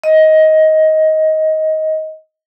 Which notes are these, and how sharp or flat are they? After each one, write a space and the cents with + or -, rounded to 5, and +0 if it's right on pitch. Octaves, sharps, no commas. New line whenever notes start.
D#5 +15